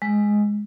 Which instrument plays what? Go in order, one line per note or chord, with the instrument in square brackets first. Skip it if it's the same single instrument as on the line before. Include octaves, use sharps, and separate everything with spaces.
[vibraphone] G#3